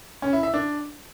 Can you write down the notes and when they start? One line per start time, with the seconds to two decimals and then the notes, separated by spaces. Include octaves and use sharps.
0.22 C#4
0.33 E4
0.43 E5
0.54 D4